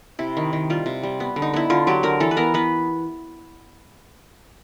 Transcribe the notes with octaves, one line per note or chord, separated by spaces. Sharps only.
C3 E4
D#3
D#3
G3 F4
C3
G3
B3
D3
D#4
B3 E4
D3 F4
F#3 G4
D3 A#4
E3 A4
B4
B3 A#4
B3 B4